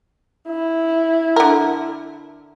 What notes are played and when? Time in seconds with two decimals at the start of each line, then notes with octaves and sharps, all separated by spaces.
0.48 E4
1.36 D3 A#4